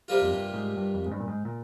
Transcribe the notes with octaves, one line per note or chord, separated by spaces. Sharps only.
C3 G3 A#3 F4
F2
G2
G#2
G2
F2
G#2
G2
A#2
G#2
A#2